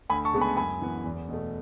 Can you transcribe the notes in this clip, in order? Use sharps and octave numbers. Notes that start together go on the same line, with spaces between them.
D2 G#5 B5
A5 C#6
C#3 G#3 B3
G#5 B5
F#2 G#5 B5
E3 B3
E2
B2 A3